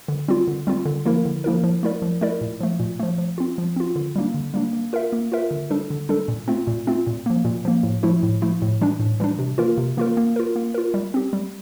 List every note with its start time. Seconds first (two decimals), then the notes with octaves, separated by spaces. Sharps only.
0.08 D3
0.28 G3 C4 F4
0.48 D3
0.67 G3 C4 F4
0.85 D3
1.05 F3 A#3 E4 A#4
1.25 D3
1.44 F3 A#3 E4 A#4
1.64 F3
1.83 A3 E4 A#4 D5
2.02 F3
2.21 A3 E4 A#4 D5
2.41 A#2
2.61 F3 A3
2.80 A#2
3.00 F3 A3
3.18 F3
3.38 C4 F4
3.58 F3
3.76 C4 F4
3.96 D3
4.16 G3 A#3 D4
4.34 D3
4.54 G3 A#3 D4
4.73 A#3
4.93 F4 A#4 E5
5.13 A#3
5.32 F4 A#4 E5
5.51 D3
5.70 G3 D4 A4
5.90 D3
6.09 G3 D4 A4
6.28 A#2
6.48 A3 C4 F4
6.67 A#2
6.87 A3 C4 F4
7.07 A#2
7.26 F3 A#3
7.45 A#2
7.65 F3 A#3
7.83 A2
8.03 F3 A3 E4
8.23 A2
8.42 F3 A3 E4
8.62 A2
8.81 E3 G3 D4
9.00 A2
9.20 E3 G3 D4
9.39 C3
9.58 E3 A#3 F4 A#4
9.77 C3
9.97 E3 A#3 F4 A#4
10.17 A#3
10.36 F4 A#4
10.56 A#3
10.74 F4 A#4
10.94 G3
11.14 C4 G4
11.33 G3